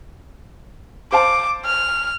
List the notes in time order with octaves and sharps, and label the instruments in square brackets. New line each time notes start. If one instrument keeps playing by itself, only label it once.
[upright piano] C5 F5 A5 [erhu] D6
[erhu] F6